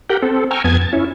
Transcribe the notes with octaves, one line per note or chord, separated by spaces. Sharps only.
G4 A#4 F#5 G5
C4 A4
G5 G#5 A#5 C#6 E6 F6
F2 B3 G#5 A5 G#6
A5
C#4 E4